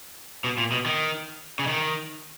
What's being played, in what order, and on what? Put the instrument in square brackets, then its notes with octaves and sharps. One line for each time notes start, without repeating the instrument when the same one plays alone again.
[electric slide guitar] B2
A#2
B2
D#3
C#3
D#3